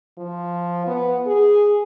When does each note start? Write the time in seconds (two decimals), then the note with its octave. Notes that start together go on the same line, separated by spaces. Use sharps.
0.18 F3
0.87 B3
1.27 G#4